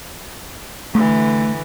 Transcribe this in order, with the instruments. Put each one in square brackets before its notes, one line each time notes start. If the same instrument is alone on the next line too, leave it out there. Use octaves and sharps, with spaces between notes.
[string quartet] D3 E3 [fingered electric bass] A3